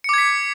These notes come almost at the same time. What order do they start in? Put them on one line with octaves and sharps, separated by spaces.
C#7 D6 G#6 B6